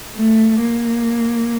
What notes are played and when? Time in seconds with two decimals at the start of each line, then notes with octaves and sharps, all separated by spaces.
0.15 A3
0.60 A#3